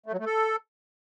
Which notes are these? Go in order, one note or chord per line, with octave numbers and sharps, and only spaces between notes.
A3
F#3
A3
A4